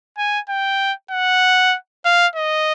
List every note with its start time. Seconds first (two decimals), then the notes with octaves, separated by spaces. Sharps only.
0.18 G#5
0.49 G5
1.11 F#5
2.06 F5
2.36 D#5